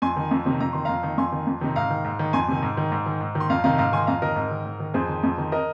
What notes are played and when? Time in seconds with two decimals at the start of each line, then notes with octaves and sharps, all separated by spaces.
0.02 F2 G#5 C6
0.16 D#3
0.31 F2
0.46 C3 D#3
0.60 F2 A#5
0.73 D#3 C6
0.85 F2 F5 A#5
1.03 D#3
1.17 F2 G#5 C6
1.32 D#3
1.47 F2
1.61 C3 D#3
1.76 G#2 F5 A#5
1.90 D#3
2.05 G#2
2.19 D#3
2.33 F2 G#5 C6
2.48 C3 D#3
2.63 G#2
2.77 D#3
2.92 G#2
3.06 D#3
3.21 G#2
3.35 D#3
3.40 C6
3.50 F2 F5 A#5
3.64 C3 D#3 F5 A#5
3.78 G#2 F5 A#5
3.93 D#3 G#5 C6
4.07 F2 F5 A#5
4.22 D#3 A#4 D#5
4.36 G#2
4.51 D#3
4.65 G#2
4.80 D#3
4.94 F2 G#4 C5
5.09 D#3
5.23 F2
5.38 D#3
5.52 A#4 D#5